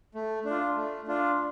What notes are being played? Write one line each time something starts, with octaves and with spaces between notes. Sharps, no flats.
A3
D4
F4
A3
D4 F4